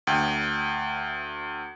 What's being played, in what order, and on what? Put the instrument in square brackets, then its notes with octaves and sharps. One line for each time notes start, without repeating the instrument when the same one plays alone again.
[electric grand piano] D2 G5